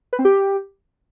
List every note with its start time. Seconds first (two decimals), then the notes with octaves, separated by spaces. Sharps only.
0.13 B4
0.19 C4
0.25 G4